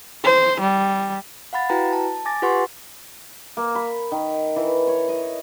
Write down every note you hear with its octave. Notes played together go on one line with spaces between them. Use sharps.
C5
G3
F5 F#5 B5 A6
E4 F#4 B4 G5 A#5
A5
G#5 D6 A6 A#6
F4 G4 B4 F#5 C6 C#6
A#3
B5
D#3
E3
C#5
D#5